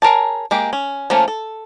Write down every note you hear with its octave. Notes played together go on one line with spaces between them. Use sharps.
G#4 A#4 C#5 A5
G#3 A#3 G4
C#4
F3 A3 A#3 C#4
A4